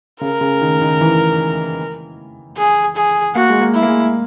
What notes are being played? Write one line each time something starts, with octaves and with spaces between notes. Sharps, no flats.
C#3 A#4
C#3
D#3
D#3
E3
G#4
G#4
A#3 F#4
G#3
A#3
E4
A#3
G#3